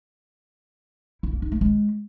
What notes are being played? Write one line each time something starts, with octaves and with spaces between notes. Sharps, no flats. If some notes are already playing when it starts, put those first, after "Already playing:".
E4
A#3
D#4
A3
G#3